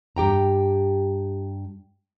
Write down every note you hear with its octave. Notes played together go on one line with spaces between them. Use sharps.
G2 G4 G5 A#5